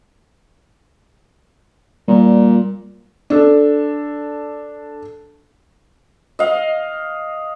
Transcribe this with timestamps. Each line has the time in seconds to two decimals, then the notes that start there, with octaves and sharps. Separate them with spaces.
2.08 A#2 G3
3.30 D4 A4
6.39 D#5 F5